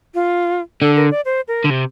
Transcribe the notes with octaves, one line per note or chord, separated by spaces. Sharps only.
F4
D3 A4
A#4
D5
C5
A#4
D3
C3